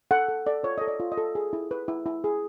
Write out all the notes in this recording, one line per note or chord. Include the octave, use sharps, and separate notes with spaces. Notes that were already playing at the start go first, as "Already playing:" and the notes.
A4 F#5
A4
A4 D5
F4 C#5
A4 D#5
D5
F4
D#5
A4
G#4
E4
B4
E4
E4
G#4